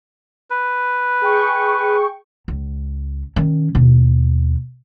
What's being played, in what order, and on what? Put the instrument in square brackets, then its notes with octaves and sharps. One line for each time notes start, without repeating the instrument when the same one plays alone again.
[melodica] B4
[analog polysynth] G#4 G5 C#6
[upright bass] C#2
D#3 C#4
D#2 B2